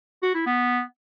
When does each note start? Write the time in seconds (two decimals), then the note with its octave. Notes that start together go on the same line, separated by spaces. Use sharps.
0.22 F#4
0.34 E4
0.46 B3